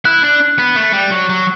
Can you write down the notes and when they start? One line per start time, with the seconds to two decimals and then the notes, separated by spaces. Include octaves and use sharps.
0.05 E4 F#6
0.23 D4
0.58 B3
0.75 A3
0.93 G3
1.11 F#3
1.29 F#3